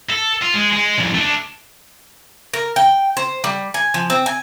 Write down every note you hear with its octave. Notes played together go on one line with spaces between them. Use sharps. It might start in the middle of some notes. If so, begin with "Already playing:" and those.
A4
F4
G#3
G#3
C2 F2
A3 D4
A#4
G5
C5
G3
G#5
F3
C4
G#5